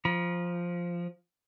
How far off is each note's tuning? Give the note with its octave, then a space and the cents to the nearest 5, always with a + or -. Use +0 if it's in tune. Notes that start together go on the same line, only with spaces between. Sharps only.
F3 +0 A#5 +45